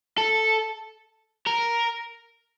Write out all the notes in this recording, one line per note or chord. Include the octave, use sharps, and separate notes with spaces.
A4
A#4